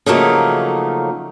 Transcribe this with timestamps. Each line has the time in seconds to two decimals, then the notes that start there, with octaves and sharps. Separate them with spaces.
0.06 C#3 F3 F#3 A3 A#3 D#4